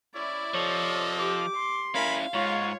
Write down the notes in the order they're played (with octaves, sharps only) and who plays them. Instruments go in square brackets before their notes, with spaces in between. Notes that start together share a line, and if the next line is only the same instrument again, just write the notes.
[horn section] C#4 E4 [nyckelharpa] D5
[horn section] C3 A4 D#5 [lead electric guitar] F3 [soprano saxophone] C#5
[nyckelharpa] G4 [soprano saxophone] D6
[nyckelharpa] C6
[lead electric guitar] C#4 E4 [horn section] A#4 G#5 B5 [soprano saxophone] F5
[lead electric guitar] G#2 [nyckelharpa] F4 [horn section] C#5